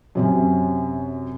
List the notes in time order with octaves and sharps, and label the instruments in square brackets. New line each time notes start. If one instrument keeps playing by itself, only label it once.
[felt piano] F#2 C3 C#4